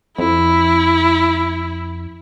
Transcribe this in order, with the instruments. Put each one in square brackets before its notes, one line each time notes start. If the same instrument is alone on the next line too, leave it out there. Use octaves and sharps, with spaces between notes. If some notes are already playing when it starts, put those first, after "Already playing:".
[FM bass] F2 [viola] E4